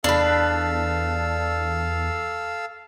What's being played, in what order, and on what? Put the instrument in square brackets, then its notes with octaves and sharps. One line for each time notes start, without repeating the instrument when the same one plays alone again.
[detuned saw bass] E2 [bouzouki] D4 B4 [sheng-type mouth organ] A4 F5 E6